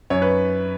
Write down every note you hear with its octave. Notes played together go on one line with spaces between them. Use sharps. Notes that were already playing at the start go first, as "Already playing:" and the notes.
F#2 C#5
B4